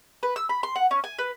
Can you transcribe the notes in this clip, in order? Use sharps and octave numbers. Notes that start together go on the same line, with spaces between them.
B4
E6
B5
C6
F#5
C#4
G#5
B4